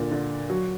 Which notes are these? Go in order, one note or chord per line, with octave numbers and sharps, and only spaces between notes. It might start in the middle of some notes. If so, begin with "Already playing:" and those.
Already playing: A#2 D3
D3
F#3